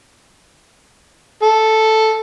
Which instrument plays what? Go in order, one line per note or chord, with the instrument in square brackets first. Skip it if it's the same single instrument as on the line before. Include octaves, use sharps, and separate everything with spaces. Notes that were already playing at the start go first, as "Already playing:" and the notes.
[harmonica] A4